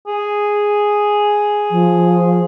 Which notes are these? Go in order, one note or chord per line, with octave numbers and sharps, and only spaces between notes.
G#4
F3